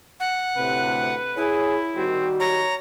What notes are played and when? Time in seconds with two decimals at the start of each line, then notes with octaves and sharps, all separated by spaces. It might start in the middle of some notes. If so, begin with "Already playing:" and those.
0.20 F#5
0.57 D2 A2 C3 B4
1.37 E4 G#4 C#5
1.96 D#3 G3 C4 F#4
2.40 C#5 A#5